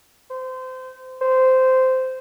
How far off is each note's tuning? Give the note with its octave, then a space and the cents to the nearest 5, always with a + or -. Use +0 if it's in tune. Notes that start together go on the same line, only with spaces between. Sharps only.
C5 -25
C5 -10